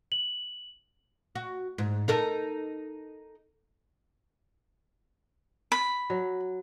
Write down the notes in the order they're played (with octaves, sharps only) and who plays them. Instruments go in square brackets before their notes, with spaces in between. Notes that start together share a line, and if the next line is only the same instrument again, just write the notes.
[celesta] F#7
[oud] F#4
G#2
D#4 A4 A#4
[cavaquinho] B5
[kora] F#3